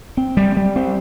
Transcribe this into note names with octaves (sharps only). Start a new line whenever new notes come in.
C4
G3
G3
C4